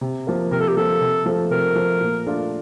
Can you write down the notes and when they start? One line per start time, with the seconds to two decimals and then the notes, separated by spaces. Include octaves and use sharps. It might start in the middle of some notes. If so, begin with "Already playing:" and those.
0.01 C3
0.27 F3 A#3
0.51 C3 A#4
0.60 A4
0.68 G4
0.77 F3 A#3 A4
1.01 C3
1.26 F3 A3
1.51 C3 A#4
1.76 F3 A3
2.01 A#2
2.27 A3 D4 F4